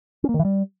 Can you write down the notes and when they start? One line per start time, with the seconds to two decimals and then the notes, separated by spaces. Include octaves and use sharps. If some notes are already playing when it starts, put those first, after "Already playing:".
0.24 C#4
0.29 A#3
0.34 D#3
0.39 E3
0.45 G3